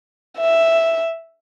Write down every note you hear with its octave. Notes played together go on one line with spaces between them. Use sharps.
E5